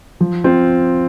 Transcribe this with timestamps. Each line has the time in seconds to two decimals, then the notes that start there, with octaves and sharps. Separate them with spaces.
0.21 F3
0.44 C4 F4